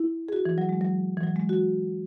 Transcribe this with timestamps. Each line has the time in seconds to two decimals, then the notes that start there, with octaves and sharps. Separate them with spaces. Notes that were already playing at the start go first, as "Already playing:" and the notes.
Already playing: E4
0.29 G#4
0.33 F#4
0.46 E3
0.58 F#3
0.69 G#3
0.81 F#3
1.17 E3
1.23 F#3
1.36 G#3
1.49 F#4